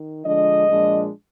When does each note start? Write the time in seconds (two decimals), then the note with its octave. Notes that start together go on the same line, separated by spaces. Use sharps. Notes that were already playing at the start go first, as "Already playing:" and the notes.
Already playing: D#3
0.24 D3 F3 G#3 D4 D#5
0.68 A#2 F3 G#3 D4